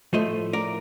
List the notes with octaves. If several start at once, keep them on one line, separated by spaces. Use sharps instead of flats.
A2 F3 A3 C5 D#5
A#4 D5